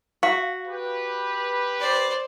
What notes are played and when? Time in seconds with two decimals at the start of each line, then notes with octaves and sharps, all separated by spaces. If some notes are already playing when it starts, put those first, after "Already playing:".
0.23 F#4 F5
0.68 G4 B4
1.80 C5 D5